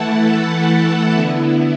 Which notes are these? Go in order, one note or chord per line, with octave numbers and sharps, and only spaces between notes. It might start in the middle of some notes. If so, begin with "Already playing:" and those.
Already playing: E3 A3 E4 F#5 A5
A4
D3 B3 E4